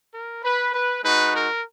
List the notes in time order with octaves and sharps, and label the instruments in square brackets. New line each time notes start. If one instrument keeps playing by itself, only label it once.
[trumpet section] A#4
B4
B4
G#3 D#4 F#4 B4
A#4